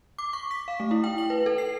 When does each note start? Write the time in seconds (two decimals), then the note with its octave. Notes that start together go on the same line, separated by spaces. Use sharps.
0.19 D6
0.33 C#6
0.51 B6
0.68 F5
0.80 A3
0.91 E4
1.04 G5
1.18 F#7
1.30 B4
1.46 A4
1.58 C7